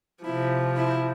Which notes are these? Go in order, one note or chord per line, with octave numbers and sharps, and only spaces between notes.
C3 F3 E4
E4